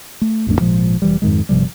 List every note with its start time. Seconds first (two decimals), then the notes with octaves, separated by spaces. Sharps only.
0.21 A3
0.47 A1 F2 A3 D4
0.60 G#1 A#2 F3 G#3
1.02 F1 E3 G3
1.22 F2 G#2 D#3 G#3
1.49 G1 C3 F3 G3